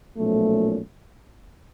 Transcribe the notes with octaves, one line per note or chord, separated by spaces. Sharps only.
B1 A#2 F3 A3 C#4